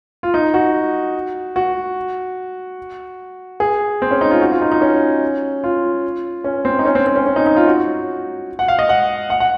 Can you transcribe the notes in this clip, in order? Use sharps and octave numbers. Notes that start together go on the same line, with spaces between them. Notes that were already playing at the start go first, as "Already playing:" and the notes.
F4
D#4
F#4
F#4
G#4
C4
C#4
D#4
F4
F#4
F4
D#4
D#4
C#4
F4
C#4
C4
D#4
C#4
C4
C4
C#4
C#4
D#4
D#4
F4
F#4
F#5
F5
D#5
F#5
F#5
F#5